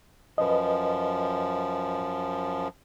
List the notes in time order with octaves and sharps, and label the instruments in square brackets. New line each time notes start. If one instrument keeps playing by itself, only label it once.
[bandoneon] F#2 F3 [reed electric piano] B4 D#5